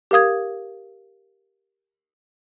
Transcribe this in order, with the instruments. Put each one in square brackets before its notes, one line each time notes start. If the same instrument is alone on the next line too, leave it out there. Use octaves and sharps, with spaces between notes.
[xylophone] G4 A#4 F5 D#6 G#6